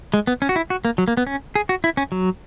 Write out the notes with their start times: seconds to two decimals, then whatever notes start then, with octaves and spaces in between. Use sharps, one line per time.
0.14 G#3
0.27 B3
0.42 C#4
0.49 F#4
0.56 E4
0.70 F#4
0.85 A#3
0.98 F#3
1.08 A#3
1.17 B3
1.27 C#4
1.55 G#4
1.69 F#4
1.84 E4
1.97 C#4
2.12 F#3